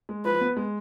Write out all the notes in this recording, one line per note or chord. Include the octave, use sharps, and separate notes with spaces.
G#3
F3 B4
B3
G#3